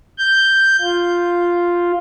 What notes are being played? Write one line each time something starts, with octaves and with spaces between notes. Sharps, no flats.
G6
F4